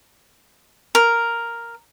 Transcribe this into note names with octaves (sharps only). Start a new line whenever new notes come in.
A#4